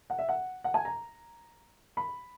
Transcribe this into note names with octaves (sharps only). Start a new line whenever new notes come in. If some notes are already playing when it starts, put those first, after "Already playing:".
F#5
E5
F#5
F#5
G#5
A#5
B5